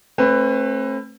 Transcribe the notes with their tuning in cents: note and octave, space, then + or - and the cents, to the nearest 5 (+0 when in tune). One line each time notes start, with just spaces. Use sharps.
A3 +0 C4 +40 B4 +15